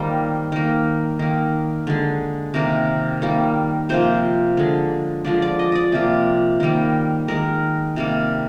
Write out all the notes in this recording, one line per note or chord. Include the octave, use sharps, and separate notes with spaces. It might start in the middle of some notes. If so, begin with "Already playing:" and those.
Already playing: D#3 G3 A#3 C5
D#3 A#3
D#3 A#3
D3 G#3
C3 D#3 A#3 A#4
D#3 G3 A#3
C3 F3 A#3 C5
D3 G#3
D3 F3 G#3 D5
D5
D#5
D5 D#5
C3 F3 A#3
D#3 G3 A#3
D#3 G#3 A#4
C3 G3 A#3